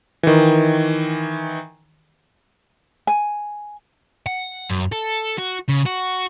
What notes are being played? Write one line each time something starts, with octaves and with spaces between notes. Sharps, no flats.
D#3 E3
G#5
F#5
F#2
A4
F#4
C#3
F#4